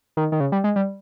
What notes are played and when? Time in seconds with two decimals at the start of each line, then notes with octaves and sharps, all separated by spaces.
0.17 D#3
0.32 D#3
0.40 C#3
0.52 G3
0.64 G#3
0.76 G3